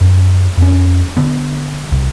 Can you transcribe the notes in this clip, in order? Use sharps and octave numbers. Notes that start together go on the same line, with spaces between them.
F#2
F2 C#4
D3 B3
C2